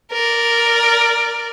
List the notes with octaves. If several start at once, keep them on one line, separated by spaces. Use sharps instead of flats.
A#4 D5